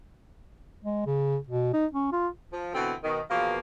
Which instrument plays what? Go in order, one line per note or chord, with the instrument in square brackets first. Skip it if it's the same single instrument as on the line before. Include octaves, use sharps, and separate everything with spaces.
[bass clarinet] G#3
C#3
B2
D#4
C#4
F4
[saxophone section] F3
B2 D3 E3 B3 C4
B2 D#3
E2 B2 F3 A#3